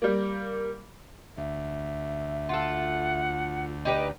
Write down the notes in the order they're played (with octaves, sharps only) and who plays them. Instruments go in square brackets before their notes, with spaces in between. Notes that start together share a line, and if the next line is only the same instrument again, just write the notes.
[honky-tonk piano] G3 A#3
[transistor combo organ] D2 [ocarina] E5
[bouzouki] F4 A4 [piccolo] F#5
[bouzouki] D#4 G4 B4 [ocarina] D5